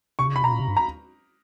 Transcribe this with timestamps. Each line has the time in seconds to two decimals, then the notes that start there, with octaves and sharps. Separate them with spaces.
0.19 C3 C#6
0.27 C#3
0.35 C3 B5
0.43 B2 A#5
0.52 A#2
0.60 C3
0.68 G2
0.77 A#5